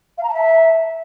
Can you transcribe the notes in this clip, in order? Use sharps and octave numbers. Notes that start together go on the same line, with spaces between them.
F5
A#5
A5
E5